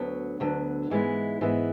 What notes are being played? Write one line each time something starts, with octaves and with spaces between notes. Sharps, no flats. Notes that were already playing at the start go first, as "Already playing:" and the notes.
Already playing: D2 D3 F#3 B3
D2 D3 F#3 B3
G#2 E3 G#3 B3 E4
G#2 E3 G#3 B3 E4